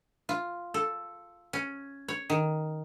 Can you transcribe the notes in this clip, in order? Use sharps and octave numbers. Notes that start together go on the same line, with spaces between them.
F4
A4
C#4
C#5
D#3